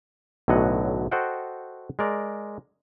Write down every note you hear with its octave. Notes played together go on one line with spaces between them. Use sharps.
B1 A2 D3 F#3 D#5 F#5
F#4 A4 C5 D#5 F#5 G5
G#3 A#4 D5